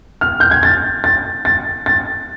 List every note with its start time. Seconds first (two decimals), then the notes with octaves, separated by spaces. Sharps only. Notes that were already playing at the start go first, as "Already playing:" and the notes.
0.21 F6
0.40 G6
0.51 G#6
0.63 A6
1.04 A6
1.45 A6
1.86 A6